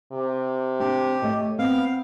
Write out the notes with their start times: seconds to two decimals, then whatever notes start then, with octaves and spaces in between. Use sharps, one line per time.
0.12 C3
0.80 C4 D4 G4
1.22 A3 C#5 D#5
1.59 B3 C4 F5